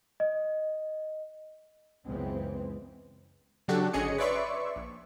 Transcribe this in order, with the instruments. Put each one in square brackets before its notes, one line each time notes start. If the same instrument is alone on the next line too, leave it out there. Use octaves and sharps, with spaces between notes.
[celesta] D#5
[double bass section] C#2 F#2 E3 G#3 B3 C4
[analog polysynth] C#3 F#3 D4 F#4 G4 A4
G#1 D3 C#4 G#4 D#5 C#7
B4 C#5 D5 E5 C6 C#6
A#1